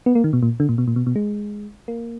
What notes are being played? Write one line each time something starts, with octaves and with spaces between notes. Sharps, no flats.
B3
A#3
D#3
B2
A#2
D3
A#2
B2
A#2
B2
B2
G#3
A#3